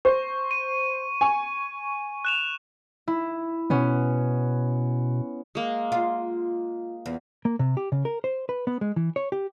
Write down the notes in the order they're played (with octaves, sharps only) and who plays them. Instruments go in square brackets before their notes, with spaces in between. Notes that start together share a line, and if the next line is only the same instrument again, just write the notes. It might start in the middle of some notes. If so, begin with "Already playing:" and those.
[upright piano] C5 [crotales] C#6
[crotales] D#7
[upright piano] G#5 C#6
[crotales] F#6 E7 F7
[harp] E4
[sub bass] B2 [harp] B3 C#4
[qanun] G#3 A#3
[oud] F4
E2
[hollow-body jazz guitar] A#3
C3
G4
C#3
A#4
C5
B4
B3
G#3
E3
C#5
G4